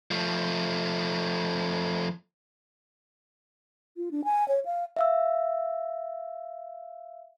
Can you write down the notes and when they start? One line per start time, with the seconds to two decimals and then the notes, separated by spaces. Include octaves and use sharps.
0.11 F3 A3
3.97 F4
4.11 D4
4.24 G#5
4.48 C#5
4.65 F5
4.97 E5 F5 E6